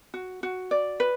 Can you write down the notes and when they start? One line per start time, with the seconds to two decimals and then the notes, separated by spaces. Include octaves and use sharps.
0.14 F#4
0.43 F#4
0.71 D5
1.00 B4